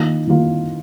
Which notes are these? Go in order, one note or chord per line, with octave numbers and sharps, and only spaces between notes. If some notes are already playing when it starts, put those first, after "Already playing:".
Already playing: D#3 A#3 F4
D#3 A#3 F4